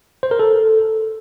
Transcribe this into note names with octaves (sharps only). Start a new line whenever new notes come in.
C5
A#4
A4